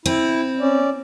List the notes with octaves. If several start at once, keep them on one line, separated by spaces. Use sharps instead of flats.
C4 E4
C#4 D5